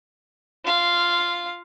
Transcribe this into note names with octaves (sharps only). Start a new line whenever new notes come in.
F4 F5